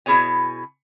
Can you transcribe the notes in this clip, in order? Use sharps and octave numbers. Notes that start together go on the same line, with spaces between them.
B2 E4 F4 G#4 C#5 G#5